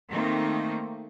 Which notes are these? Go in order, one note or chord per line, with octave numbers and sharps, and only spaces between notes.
D#3 A3 A#3 C4 D#4